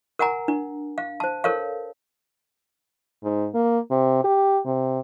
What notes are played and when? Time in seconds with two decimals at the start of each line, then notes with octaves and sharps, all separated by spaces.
0.19 A#4 F#5 G#5 A#5
0.48 D4
0.98 F5
1.20 C5 A5
1.44 A4 A#4 C#5 F5
3.23 G#2
3.54 A#3
3.90 C3
4.24 G4
4.65 C3